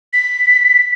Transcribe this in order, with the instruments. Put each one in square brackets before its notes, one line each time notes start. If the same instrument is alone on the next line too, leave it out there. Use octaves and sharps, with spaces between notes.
[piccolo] B6